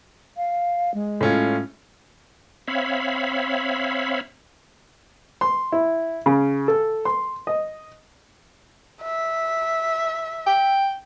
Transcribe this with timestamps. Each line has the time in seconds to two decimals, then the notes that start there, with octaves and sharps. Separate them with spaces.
0.36 F5
0.94 G#3
1.21 A2 C#4 F4
2.68 C4 C#5 E5 F5 B5
5.41 C6
5.72 E4
6.26 C#3
6.68 A4
7.05 C6
7.47 D#5
9.03 E5
10.47 G5